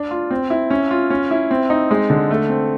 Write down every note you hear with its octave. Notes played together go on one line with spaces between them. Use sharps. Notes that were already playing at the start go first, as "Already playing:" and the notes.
Already playing: D4
F4
C4
E4
C#4
F4
C#4
E4
C4
D#4
G#3
D3
A3
C4